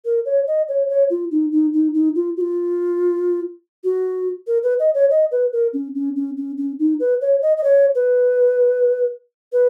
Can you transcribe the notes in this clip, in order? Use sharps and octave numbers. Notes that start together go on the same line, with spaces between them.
A#4
C#5
D#5
C#5
C#5
F4
D#4
D#4
D#4
D#4
F4
F#4
F4
F#4
A#4
B4
D#5
C#5
D#5
B4
A#4
C#4
C#4
C#4
C#4
C#4
D#4
B4
C#5
D#5
D#5
C#5
B4
B4